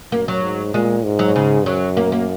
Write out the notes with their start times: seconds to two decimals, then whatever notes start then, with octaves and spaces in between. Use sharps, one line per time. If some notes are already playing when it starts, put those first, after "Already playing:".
0.12 F#2 A#3
0.28 F#3
0.42 G#2
0.74 A#2 G#3
1.05 G#2
1.19 F#3
1.36 C#3
1.66 F#2 F#3
1.97 A#3
2.12 A#3